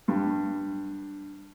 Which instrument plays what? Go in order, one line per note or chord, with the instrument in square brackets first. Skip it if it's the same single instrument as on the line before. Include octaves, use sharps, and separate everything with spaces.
[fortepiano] G2